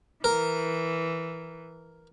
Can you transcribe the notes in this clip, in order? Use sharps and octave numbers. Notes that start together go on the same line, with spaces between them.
E3 A#4